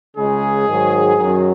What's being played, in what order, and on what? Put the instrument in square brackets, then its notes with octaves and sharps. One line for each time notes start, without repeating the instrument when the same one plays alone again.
[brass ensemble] C#2 C#3 G#3 [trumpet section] G#4
[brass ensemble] G#2 D#3 F#3
F#2 D#3 F#3